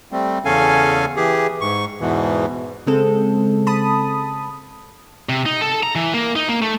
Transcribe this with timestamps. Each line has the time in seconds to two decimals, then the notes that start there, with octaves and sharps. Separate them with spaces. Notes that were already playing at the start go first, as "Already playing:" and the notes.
0.12 G3 A3 C4
0.45 E2 C#3 C#4 A4 F5 G#5
1.16 E3 G4 G#4
1.61 G#2 C#6
2.01 E2 G#2 B2 E3
2.87 C#3 G#3 C4 A4
3.67 A5 B5 D#6
5.29 C3
5.46 D#4
5.61 A4
5.83 A#5
5.95 E3
6.14 A#3
6.36 D#4
6.49 A#3
6.62 A3